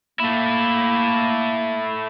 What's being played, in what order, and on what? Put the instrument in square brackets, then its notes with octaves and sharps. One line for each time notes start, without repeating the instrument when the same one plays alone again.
[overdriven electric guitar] A3 E4 [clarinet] A#3